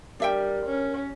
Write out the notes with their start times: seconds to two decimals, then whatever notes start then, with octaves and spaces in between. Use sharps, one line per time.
0.20 G3 D4 A#4 E5 G5
0.66 C#4